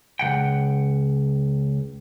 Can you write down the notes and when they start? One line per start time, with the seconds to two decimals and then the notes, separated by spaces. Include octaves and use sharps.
0.19 C#2 D#3 F#5 G5